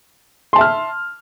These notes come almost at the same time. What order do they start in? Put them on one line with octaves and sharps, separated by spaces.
C6 A5 E5 F6